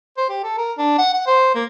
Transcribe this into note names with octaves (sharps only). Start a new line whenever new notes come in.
C5
G4
A4
A#4
D4
F#5
F#5
C5
A#3